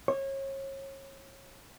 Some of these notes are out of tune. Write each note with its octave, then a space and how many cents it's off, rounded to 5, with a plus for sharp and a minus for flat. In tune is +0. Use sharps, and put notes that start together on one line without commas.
C#5 -30